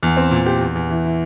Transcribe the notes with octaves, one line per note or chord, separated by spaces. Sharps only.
E2
C4
A#2
G4
E2
E2
E3
E3